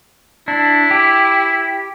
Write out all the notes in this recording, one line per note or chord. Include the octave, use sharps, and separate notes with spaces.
D4 E4
G4